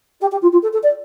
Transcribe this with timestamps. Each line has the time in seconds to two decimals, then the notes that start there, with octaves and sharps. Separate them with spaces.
0.21 G4
0.31 G4
0.42 F4
0.52 F4
0.62 A4
0.72 A4
0.83 D5